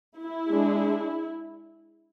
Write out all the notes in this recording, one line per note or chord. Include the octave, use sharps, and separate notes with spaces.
E4
G#3 D4